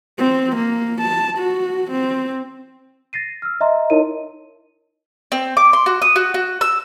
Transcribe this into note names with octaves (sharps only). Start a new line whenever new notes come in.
C4
A#3
A5
F#4
C4
A6 A#6 C7 D#7
E6 F6
D#5 E5 A#5 C6
D#4 E4 A#4 C#5 D#5 D#7
C4
D6
C6
F#4
D#6
F#4
F#4
E6